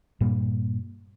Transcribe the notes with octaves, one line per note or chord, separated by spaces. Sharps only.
G2 A#2 G3 A#3